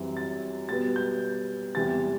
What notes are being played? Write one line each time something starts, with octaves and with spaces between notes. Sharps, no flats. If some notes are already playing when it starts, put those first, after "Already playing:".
Already playing: F#2 E3 G3 C4
A6
B2 G3 B3 A6
G6
E2 C3 E3 G3 C4 A6